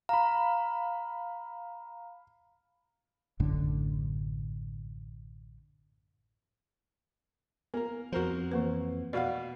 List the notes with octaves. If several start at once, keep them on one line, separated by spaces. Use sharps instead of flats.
F5 A#5 B5
A1 F#2 A2 D3
A#3 B3 A#4
F2 F3 F#4 A#4 C5
E3 A#3 B4
B2 F#4 D5 F5 F#5